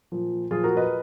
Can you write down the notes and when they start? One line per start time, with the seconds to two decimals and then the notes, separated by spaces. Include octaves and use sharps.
0.12 A#2 F3
0.51 A#2 F3 F4 G#4
0.64 F#4 A#4
0.77 B4 D#5